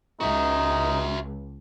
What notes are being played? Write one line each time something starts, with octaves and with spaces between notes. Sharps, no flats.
C#2 D#4 F#4 E5